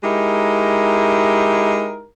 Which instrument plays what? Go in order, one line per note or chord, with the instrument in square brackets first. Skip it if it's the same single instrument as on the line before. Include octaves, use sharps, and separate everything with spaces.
[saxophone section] G#3 D#4 E4 G4 A#4